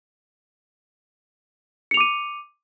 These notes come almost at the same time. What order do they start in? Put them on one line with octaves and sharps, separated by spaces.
C#7 F7 D6 D#7